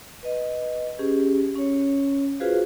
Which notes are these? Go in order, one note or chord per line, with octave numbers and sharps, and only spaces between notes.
B4 D#5
C#4 G4 G#4
C#4 C#5
F4 F#4 G#4 B4 C5 F5